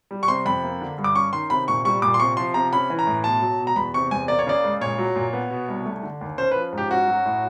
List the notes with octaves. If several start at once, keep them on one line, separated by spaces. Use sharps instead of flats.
G3
C#6
C3 C6
F2 B5
A#3
D3
G2
D6
C#4 C#6
D#3 C6
C3 B5
A#2 C#6
G3 C#6
A#2 D6
C6
C3 C#6
F3 C6
C3 A#5
C#4 B5
E3
A#5
A2
B2 A5
F#3
B2
A#5
E2 B5
C3 C#6
E2 G#5
A#3 D5
C#5
C#3 D5
C#2
A#2 C#5
F#3
A#2
B3
B2
C2
A3
D3
D#2
C#4 C5
F3 B4
G#2
G4
C#4 F#4
F#3
A2